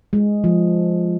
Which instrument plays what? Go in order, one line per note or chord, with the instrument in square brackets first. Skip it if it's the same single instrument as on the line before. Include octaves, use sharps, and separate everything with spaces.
[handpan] G#3
F3